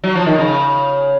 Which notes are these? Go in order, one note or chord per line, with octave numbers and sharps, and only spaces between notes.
F#3
F3
D#3
C#3